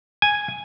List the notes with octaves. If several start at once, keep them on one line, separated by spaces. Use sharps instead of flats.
G#5